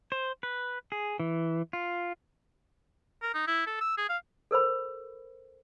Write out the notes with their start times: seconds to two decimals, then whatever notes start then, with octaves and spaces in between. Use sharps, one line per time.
0.12 C5
0.43 B4
0.92 G#4
1.20 E3
1.73 F4
3.22 A#4
3.34 D#4
3.47 E4
3.67 A4
3.81 E6
3.97 G#4
4.09 F5
4.51 A4 A#4 C5 B5